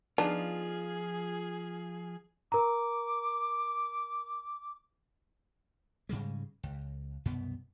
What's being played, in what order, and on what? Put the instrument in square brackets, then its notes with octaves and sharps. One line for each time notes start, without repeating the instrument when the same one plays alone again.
[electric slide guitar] F3 F4 [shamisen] B3 D4 D#4 [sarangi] G#4
[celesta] A#4 A#5 [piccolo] D6
[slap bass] G#2 C#3 G3 G#3
C#2
C2 F#2 B2 B3